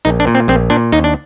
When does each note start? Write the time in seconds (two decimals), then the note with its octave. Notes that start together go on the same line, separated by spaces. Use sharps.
0.05 A#1 D#4
0.20 D4
0.27 A#2
0.35 C4
0.48 A#1 C4
0.70 A#2 D4
0.92 D#2 D#4
1.04 D4